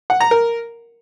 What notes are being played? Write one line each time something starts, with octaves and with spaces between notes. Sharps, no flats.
F#5
A#5
A#4